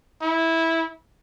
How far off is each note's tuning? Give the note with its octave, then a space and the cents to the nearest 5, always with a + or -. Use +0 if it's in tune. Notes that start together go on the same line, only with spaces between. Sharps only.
E4 -10